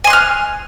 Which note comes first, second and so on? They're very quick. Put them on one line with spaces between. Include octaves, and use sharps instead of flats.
G#5 C6 F#6 F6